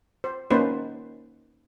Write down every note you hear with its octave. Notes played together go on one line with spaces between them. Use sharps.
C5
A#3 C#4 D#4 B4 C5